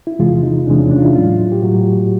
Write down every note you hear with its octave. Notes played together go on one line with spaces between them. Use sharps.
E4
E2 C3 E3 G#3 F4
D#4
E2 C3 E3 G#3 D4
C#4
D4
F4
E4
A2 F#3 F4
G4
A2 F#3 F#4